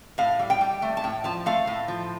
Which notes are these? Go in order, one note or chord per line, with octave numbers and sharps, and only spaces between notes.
A2 F5
G3
G5
G3
A3
A5
A2 G5
F3 A5
A3 F5
A2
F3